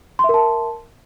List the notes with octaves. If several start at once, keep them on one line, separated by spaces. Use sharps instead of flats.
A#4 E5 A5 C6